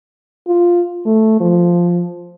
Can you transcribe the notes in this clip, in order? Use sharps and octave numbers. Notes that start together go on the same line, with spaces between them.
F4
A3
F3